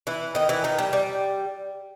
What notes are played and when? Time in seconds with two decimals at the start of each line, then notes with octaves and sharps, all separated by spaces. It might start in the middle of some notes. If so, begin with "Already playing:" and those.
0.07 E3 E4
0.35 D#3 D#4
0.49 E3 E4
0.64 D#3 D#4
0.79 G3
0.93 G3